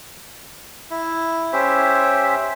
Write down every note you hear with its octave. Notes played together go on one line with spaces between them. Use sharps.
E4
C#4 G4 C5 E5